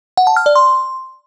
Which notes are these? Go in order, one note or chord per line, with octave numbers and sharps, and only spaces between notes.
F#5
A5
F6
D5
C6